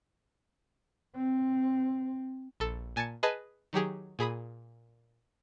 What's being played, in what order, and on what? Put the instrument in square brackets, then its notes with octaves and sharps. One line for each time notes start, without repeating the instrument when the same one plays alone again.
[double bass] C4
[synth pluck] A#1 A4
A#2 G#5 A5 G#6 A6 C#7
G#4 B4 D#5 G#5 A5
D#3 F#3 G4 G#4
A#2 G#4 B5 D#6